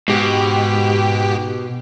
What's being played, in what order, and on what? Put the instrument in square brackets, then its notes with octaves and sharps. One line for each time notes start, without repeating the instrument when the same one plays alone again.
[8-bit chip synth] G#2 G4 [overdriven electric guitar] B2